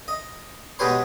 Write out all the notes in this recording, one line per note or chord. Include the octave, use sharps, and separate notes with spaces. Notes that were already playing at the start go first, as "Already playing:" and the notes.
D#5
B2 G#3 G4 B4 C#5 C6